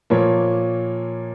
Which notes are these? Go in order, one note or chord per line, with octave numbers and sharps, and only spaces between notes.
A#2 F3 A#3 C#5